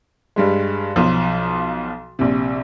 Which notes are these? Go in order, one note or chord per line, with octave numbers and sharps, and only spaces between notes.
G2 G3 G#3
B1 F3
A#1 C3